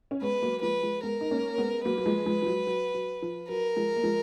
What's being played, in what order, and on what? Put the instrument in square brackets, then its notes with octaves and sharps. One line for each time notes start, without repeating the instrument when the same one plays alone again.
[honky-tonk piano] C#4
[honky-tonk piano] G#3 B3 [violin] B4
[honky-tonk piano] F#3 A#3
[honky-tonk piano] F3 G#3 [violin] B4
[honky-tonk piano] F3 G#3
[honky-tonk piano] G#3 B3 [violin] A#4
[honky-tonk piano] D#4
A#3 C#4
G#3 B3
[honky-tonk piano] F#3 A#3 [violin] B4
[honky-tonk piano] F#3
F3 G#3
F3 G#3
F3
F#3
F#3
F#3
F3
[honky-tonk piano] F#3 [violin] A#4
[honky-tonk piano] F3 G#3
A#3
F3 G#3